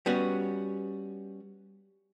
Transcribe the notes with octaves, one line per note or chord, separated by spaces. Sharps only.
G3 B3 C#4 F#4